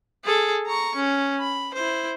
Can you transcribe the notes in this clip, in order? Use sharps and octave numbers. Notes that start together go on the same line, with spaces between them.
G#4 A4
A#5 C#6
C#4
B5
E4 C5